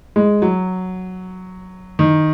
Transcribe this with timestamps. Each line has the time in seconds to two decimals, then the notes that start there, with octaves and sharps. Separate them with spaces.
0.16 G#3
0.42 F#3
1.99 D#3